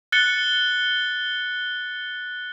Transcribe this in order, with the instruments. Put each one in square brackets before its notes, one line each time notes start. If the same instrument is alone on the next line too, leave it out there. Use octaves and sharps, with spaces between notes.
[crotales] F#6 A6 C#7 G7